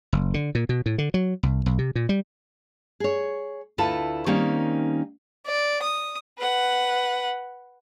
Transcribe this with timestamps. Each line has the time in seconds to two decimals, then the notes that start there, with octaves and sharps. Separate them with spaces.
0.13 F#1
0.34 D3
0.55 A#2
0.69 B2
0.86 A2
0.98 D3
1.14 F#3
1.43 C2
1.66 B1
1.79 C3
1.95 A#2
2.09 G3
3.00 G#4 C#5
3.78 D2 E4 F4 A4 B4 A5
4.26 D#3 G3 A#3 C4 C#4 D#4
5.47 D5
5.83 D#6
6.38 B4 F#5